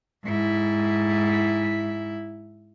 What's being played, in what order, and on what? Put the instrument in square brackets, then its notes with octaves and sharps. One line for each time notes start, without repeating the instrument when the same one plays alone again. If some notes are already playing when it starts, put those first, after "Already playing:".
[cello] G#2 E4